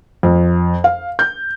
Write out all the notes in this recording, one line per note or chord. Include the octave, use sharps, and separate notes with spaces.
F2
F5
G6